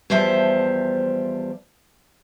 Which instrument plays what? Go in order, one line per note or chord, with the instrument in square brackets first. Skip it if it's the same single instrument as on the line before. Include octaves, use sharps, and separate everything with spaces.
[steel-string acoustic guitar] E2 F3 G3 C5 E5 A5